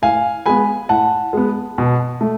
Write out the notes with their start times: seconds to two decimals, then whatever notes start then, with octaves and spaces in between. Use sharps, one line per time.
0.02 A2 F5 G#5
0.46 G#3 B3 G#5 B5
0.89 A2 F#5 A5
1.33 G#3 B3
1.78 B2
2.21 A3